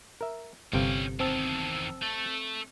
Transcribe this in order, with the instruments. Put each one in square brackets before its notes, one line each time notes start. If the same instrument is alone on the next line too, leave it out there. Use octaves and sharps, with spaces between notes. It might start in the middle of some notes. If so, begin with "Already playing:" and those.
[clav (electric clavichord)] A#4 E5
[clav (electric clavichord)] G1 C3 F5 [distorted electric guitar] C#4 G5
[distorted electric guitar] E2 D#3 [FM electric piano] C4 A5 E6
[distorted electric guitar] A3